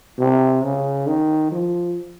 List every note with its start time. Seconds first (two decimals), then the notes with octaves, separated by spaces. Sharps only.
0.19 C3
0.63 C#3
1.07 D#3
1.52 F3